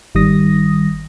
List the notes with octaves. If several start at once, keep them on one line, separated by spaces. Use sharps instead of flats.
G#1 D#3 G3 D#6 A#6